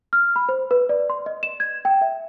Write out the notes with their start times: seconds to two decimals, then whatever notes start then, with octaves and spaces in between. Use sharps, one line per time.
0.13 F6
0.36 B5
0.49 C5
0.71 B4
0.89 D5
1.10 C6
1.26 D#5
1.43 E7
1.60 G#6
1.85 G5
2.01 E5